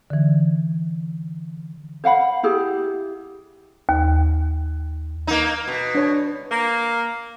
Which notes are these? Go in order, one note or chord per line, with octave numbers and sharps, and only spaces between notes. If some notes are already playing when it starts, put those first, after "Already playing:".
D3 E3
C5 F5 F#5 B5
E4 G4 G#4
D#2
A#3 D#4
B2
D4 C#5
A#3